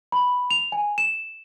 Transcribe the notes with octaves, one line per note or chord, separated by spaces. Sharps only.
B5
F7
G#5
E7